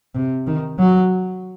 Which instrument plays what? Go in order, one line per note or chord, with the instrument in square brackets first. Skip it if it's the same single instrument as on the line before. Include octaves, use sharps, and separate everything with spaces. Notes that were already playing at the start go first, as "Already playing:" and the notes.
[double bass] C3
D#3
F#3